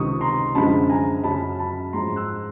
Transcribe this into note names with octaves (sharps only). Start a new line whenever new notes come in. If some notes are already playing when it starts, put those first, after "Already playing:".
Already playing: C#2 C3 D#3 C#6 D#6
A#5 C6
F#2 D3 F3 G#3 A5 B5
G#5 A#5
F#2 C#3 F#3 A5 B5
A5 B5
G#2 F3 G#3 A#5 C6
E6 F#6